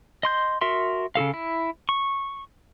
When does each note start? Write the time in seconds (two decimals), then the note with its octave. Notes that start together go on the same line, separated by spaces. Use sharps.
0.23 D#5 C6 G6
0.61 F#4 A#4 E5 C6
1.15 C#3 F#4 A4 F5
1.34 E4
1.89 C#6